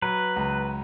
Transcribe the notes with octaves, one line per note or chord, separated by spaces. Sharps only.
F#3 B4
C#2